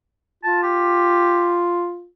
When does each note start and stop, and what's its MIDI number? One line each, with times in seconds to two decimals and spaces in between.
0.44 2.08 65
0.44 0.62 81
0.63 1.68 67